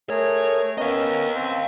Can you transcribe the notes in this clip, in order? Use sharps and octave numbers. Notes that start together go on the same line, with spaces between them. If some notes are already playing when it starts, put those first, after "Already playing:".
A3 G#4 A#4 C#5
B3 C#4 A#4 D#5 F5
C4